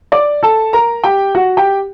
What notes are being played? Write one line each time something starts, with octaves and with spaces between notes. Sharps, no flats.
D5 D6
A4 A5
A#4 A#5
G4 G5
F#4 F#5
G4 G5